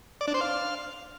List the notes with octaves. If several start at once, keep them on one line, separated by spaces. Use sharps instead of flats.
D5
D4
C5
F5